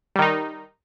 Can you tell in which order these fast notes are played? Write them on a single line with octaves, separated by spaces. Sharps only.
G3 D#3 D#4